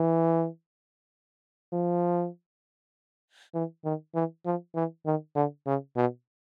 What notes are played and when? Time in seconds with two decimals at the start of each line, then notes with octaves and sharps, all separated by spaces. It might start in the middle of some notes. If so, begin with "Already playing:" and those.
Already playing: E3
1.73 F3
3.55 E3
3.85 D#3
4.15 E3
4.46 F3
4.75 E3
5.06 D#3
5.35 D3
5.67 C#3
5.96 B2